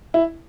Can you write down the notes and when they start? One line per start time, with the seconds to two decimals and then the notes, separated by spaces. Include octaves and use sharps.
0.14 E4